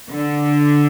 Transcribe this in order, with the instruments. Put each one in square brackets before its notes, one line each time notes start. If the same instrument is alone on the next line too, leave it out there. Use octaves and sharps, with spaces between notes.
[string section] D3